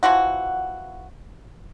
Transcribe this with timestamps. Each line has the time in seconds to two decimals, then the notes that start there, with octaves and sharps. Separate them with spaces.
0.03 E3 F3 F#4 F#5